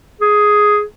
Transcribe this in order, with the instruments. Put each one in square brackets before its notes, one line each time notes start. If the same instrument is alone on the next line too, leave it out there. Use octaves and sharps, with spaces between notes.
[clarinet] G#4